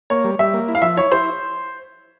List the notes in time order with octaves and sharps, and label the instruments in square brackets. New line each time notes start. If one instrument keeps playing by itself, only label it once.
[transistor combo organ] A#3 [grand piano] C#5
[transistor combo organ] G3
[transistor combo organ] G3 [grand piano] E5
[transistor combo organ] A#3
E4
[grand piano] F5
[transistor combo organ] F3 [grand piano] E5
[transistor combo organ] E4 [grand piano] C#5
[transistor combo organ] E4 [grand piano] C5